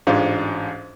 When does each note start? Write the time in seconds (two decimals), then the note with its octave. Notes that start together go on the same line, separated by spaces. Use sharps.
0.07 A1 G#2 D4 F4 C5